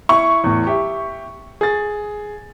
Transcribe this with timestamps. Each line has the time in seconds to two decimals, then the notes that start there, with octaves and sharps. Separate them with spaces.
0.09 E4 C#6
0.44 E2 A2
0.67 G4 E5
1.61 G#4 A6